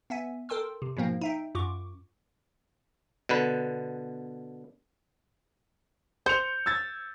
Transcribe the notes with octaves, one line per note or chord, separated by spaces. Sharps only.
B3 E5 G#5
A4 A#4 G5 C6 E6
C3
G#2 B2 F3 A#3 C4
D#4 E5 G5
F#2 F4 C#6 D6
B2 D3 B4
C5 G6 C#7 F7
E6 G#6 A6